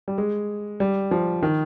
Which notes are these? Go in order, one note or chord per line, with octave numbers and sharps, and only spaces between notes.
G3
G#3
G3
F3
D#3